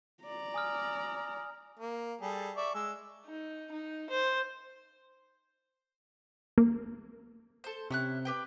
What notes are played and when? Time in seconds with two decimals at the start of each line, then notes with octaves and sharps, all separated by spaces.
0.22 D5 A#5
0.54 G#5 D#6 F6
1.79 A#3
2.21 G3 G#4 A4
2.57 D5 E5 C#6
2.75 G#3 E6
3.26 D#4
3.71 D#4
4.10 C5
6.58 A#3
7.64 A4 C5
7.90 C3 C#4 E4 F#6
8.25 G4 B4 G5